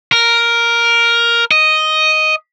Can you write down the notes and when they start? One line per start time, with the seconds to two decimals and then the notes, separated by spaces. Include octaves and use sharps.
0.12 A#4
1.51 D#5